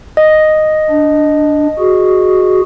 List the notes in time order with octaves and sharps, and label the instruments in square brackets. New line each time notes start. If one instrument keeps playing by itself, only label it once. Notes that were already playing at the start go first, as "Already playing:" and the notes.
[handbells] D#5
[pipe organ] D4
F#4 G#4